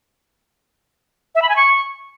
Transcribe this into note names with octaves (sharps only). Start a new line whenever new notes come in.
E5
B5
G#5
C#6